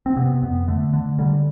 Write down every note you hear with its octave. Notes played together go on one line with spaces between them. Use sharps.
C4
C3 B3
F2 B3
D3 A3
D3
D3 G3